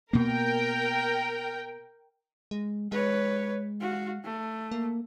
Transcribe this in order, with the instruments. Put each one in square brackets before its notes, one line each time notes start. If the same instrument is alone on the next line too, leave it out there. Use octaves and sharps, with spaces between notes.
[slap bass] B2 A#3 [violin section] A#4 G5
[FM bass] G#3
[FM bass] G#3 [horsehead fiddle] B4 C#5
[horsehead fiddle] F#4 F5
A3
[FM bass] A#3